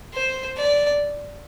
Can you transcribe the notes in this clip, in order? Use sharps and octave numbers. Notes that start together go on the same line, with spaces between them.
C5
D5